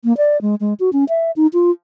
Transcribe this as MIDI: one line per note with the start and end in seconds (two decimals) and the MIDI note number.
0.04 0.16 58
0.17 0.40 74
0.42 0.55 56
0.60 0.74 56
0.80 0.90 66
0.93 1.05 61
1.09 1.31 76
1.36 1.47 63
1.53 1.71 65